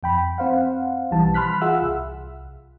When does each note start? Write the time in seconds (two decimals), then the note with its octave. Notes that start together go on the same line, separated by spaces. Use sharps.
0.03 F2 G5 B5
0.38 C4 C5 F5 F#5
1.11 B1 E3 G3 A5
1.34 B5 C6 F6 F#6 B6
1.61 F4 G#4 E5 F#5 E6
1.82 C2